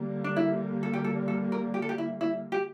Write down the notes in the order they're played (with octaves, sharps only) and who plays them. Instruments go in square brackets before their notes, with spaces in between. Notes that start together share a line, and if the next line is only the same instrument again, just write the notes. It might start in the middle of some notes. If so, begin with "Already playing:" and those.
Already playing: [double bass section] D3 G3 A#3
[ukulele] D4
E4
A4
G4
A4
A4
A#4
G4
A4
G4
E4
E4
G4